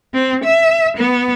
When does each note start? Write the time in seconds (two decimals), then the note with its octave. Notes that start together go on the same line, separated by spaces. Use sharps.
0.14 C4
0.44 E5
0.98 B3